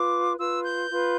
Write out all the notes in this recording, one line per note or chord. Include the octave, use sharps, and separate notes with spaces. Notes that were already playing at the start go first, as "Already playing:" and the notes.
Already playing: F4 B4 D6
F4 B4 E6
G6
F4 B4